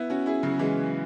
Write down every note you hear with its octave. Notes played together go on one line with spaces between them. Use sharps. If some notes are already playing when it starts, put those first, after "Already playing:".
Already playing: B3 E4
C#4 F#4
E4 G#4
C#3 F#3
E3 G#3